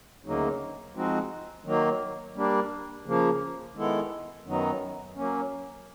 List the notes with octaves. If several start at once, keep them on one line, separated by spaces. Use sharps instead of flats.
D2 C#3 F#3 A#3 D#4
F3 G#3 C4 D#4 F#4
D#3 F#3 A#3
G3 A#3 D4
C#3 F3 A#3
D#3 G#3 B3 E4 A4
F#2 D#3 F#3 B3 D#4
F#3 A#3 C#4